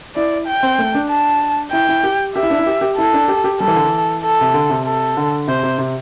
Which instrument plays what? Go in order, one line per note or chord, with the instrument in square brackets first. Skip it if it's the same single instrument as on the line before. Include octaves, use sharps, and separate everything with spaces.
[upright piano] E4 [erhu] D5
[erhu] G5
[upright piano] C4
A3
D4
[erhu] A5
[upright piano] E4 [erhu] G5
[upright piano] E4
G4
[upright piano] G4 [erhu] E5
[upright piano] E4
D4
E4
G4
G4
[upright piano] E4 [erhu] A4
[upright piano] D4
G4
G4
[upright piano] G3 [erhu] A4
[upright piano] E3
D3
E3
[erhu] A4
[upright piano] C3
D3
C3
[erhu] A4
[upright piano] D3
[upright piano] C3 [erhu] C5
[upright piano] C3
C3